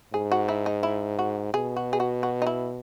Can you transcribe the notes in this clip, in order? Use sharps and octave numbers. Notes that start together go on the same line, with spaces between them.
G#2 G#4
F#4
E4
D#4
E4
F#4
B2 G#4
F#4
G#4
F#4
F#4
D#4
E4